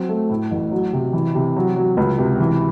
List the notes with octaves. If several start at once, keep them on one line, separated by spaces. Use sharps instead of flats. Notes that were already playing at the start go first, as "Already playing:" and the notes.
Already playing: F#3 C4
A3
A2
A1
F#3
C3
E3
C3
F#3
F#3
C#2
C3
E3